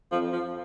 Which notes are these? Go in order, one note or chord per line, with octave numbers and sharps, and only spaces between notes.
F2 F3
F3